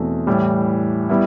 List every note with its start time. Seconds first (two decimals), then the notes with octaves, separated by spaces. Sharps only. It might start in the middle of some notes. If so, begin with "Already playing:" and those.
Already playing: E2 B2 A3 C4 E4
0.27 A2 E3 G3
1.09 G3 B3 E4